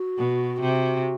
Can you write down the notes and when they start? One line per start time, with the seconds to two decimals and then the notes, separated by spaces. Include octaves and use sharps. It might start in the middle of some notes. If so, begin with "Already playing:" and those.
Already playing: F#4
0.17 B2
0.61 C3